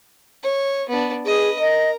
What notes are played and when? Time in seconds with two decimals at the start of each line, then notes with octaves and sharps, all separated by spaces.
0.43 C#5
0.89 B3 D4
1.26 G#4 B4 D#5
1.60 A#4 D#5